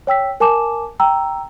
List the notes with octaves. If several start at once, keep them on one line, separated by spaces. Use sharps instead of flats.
C#5 G5 E6 B6
A#4 G#5 A5 D6 E7
G5 A#5 E6